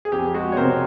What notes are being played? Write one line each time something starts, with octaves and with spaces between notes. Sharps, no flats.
G#4
F2 G4
G#3 F#4 G#4
C#5
C3 A#4 C5